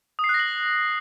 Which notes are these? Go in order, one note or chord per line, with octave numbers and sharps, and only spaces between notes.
D#6
C7
F#6
A#6
F#7